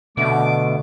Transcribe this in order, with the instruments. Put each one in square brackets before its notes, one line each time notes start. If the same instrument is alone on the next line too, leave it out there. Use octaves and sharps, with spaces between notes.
[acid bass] B2 [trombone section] D3 [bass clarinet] A3 [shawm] D6